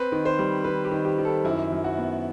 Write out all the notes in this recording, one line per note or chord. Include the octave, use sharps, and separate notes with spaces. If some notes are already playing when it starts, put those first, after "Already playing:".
Already playing: C4 B4
D#3
C5
G3
D#3 B4
G4
D#3
G4
D#3
A4
F#2 E4
F#2
F#4
B3